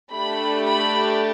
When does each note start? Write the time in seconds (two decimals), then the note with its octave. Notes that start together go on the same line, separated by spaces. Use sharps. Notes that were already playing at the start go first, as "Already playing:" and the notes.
0.12 A3 D4 G4 B5
0.65 B5